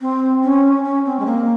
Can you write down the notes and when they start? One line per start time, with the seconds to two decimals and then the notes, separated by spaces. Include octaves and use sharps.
0.01 C4
0.43 C#4
0.84 C#4
1.05 C4
1.19 G#3
1.26 A#3